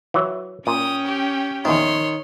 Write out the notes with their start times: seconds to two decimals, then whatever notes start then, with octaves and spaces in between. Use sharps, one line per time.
0.14 E3 F#3
0.67 A#2 C#4 G5 D#6
1.07 G4
1.65 A#1 E2 D#3 C#5 C6